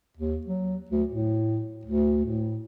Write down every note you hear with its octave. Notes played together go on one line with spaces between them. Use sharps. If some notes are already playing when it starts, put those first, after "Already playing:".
D#2
F#3
D2
A2
D2
A2